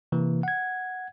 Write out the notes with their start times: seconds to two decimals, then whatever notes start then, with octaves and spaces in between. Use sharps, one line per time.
0.12 C3 E3 A#3
0.43 F#5 G#6